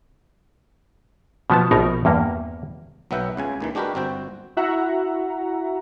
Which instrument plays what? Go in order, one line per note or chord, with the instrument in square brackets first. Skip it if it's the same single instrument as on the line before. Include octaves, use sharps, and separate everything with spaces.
[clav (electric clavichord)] B2 F3 B3 A5
A#1 B2 D#4 A#4
E2 G2 A#3
B1 F#3 B3 E5 F#5 G5
C#2 C#3 G#5
D#2 D#3 E3
G#3 D4 F#4 G4 A#4 B4
G1 C4 F#4 G5
[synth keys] E4 F#4 E5 F#5 A#5